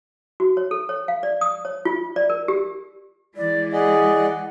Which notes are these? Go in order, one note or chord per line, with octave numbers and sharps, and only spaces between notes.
F#4
C#5
A4
C#5
F5
D5
D#6
C#5
F4
D5
A#4
G4
E3 G#3 E4 D5
G#4 D5 D#5 F#5